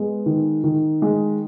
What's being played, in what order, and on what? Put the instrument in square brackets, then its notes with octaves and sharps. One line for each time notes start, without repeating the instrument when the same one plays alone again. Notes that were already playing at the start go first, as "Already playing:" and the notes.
Already playing: [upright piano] G#3 B3
D#3
D#3
G#3